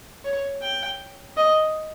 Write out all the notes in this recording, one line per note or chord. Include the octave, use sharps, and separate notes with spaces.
C#5
G5
D#5